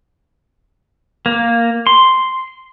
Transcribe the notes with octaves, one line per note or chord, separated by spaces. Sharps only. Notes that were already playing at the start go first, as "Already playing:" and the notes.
A#3
C6